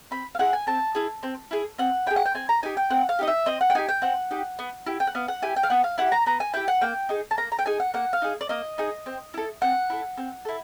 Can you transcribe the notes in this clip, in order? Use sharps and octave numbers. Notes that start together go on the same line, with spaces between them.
C4 B5
F5
E4 G#4 F#5
G#5
C4 A5
E4 G#4
C4
E4 G#4
C4 F#5
E4 G#4 G5
F#5
G5
C4 G#5
A#5
D#4 G4 G#5
G5
C4 F#5
F5
D#4 G4 D#5
E5
C4 D#5
F#5
G5
D#4 G4 G#5
G5
C4 F#5
D#4 G4
B3
E4 G4
G5
F#5
B3 F5
F#5
E4 G4 G#5
G5
F5
B3 F#5
F5
E4 G4 F#5
A#5
B3 A#5
G#5
E4 G4 G5
F#5
A#3 G5
D#4 G#4
A5
A#3 A#5
A#5
G5
D#4 G#4 G#5
F#5
A#3 F#5
F5
D#4 G#4
D5
A#3 D#5
D#4 G#4
C4
E4 A4
C4 F#5
E4 A4
C4
E4 A4